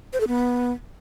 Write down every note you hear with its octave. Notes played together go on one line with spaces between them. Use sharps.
C5
A4
B3